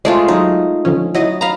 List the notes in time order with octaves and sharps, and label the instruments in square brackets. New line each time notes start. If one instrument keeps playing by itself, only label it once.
[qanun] G#3 A3 F4 [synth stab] G#4 C5 D5
[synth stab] F#3 [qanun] D#4
[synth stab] D3 F3 C#4
[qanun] F#3 [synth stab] E4 D#5
[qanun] B4 F5 [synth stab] A#5